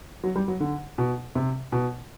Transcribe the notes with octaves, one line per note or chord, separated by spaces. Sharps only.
F#3
G3
F#3
D3
B2
C3
B2